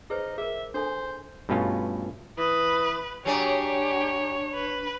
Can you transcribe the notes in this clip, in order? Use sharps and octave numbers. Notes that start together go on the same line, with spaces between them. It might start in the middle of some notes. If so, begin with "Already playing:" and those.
D#4 G#4 B4 C5
G#4 A#4 E5
D4 A4 C5 G#5
G2 B2 A3 C#4 F4
E3 B4 D#6
F#3 D4 G4 G#4 C#5 D5
B4